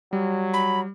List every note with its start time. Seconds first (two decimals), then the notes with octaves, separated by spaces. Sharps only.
0.13 F#3 G3
0.54 B5